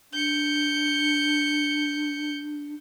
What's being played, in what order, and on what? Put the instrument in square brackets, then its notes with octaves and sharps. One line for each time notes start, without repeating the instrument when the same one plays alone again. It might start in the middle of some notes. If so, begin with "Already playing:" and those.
[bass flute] D4 [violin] G6 C#7